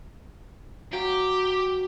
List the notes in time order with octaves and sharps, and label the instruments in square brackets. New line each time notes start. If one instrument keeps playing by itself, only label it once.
[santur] F#3 F5 [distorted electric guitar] G4